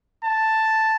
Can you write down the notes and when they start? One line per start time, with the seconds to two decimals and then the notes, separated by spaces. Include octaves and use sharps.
0.25 A5